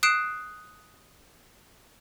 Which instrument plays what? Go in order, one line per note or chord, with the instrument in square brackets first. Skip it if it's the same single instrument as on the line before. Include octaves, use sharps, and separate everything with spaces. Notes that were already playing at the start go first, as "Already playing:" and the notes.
[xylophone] D#6 F#6 C7 D7 E7